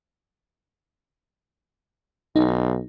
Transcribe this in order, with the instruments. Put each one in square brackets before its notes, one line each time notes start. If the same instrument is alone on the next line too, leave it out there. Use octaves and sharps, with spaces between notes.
[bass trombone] B1 [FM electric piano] D#4